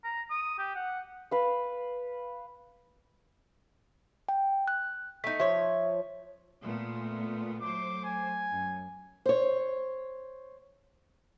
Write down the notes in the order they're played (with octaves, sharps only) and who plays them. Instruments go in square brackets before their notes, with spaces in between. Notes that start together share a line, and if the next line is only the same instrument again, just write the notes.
[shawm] A#5
D#6
G4
F#5
[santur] B4 F5
[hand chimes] G5
F#6
[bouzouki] A3 D#4 [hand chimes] B6
[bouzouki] F3 C#5 [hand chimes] E5
[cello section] A#2 A3 B3
[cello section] F#3 A3 C5 [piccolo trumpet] D6
[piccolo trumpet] G#5
[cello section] F#2
[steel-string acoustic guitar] C5 C#5